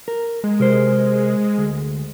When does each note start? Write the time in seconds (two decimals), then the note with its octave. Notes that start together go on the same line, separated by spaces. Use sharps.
0.08 A#4
0.44 G#3
0.60 C3 A#4 C5
1.58 D2